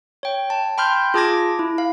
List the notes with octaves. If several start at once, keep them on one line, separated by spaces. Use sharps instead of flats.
C#5 G5
A5
G5 B5 C6 F6 G6
F4 G#4 A5 D6 G#6 A#6
E4
F5